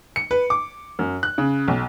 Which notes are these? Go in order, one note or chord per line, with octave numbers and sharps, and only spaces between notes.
C#7
B4
D6
F#2
F#6
C#3
B1